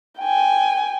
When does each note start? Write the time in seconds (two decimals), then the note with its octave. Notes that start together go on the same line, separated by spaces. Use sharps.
0.20 G5 G#5